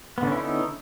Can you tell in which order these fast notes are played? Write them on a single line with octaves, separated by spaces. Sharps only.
B3 D3 C#4 E4 D#4